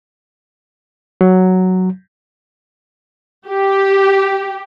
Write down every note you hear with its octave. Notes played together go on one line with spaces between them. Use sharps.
F#3
G4